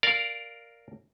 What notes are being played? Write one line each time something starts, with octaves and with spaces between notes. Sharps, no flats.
A#4 D5 F5